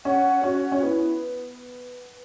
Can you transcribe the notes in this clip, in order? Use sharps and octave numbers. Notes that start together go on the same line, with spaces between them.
C#4 F#5
C#4 F#4
C#4
B3 E4